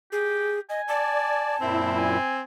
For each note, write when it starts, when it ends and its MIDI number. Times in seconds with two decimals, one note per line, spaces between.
0.12 0.60 67
0.12 0.60 68
0.70 0.81 75
0.70 1.67 80
0.88 1.56 74
0.88 2.00 81
1.61 2.18 42
1.61 2.18 46
1.61 2.41 60
1.61 2.18 64
1.97 2.42 80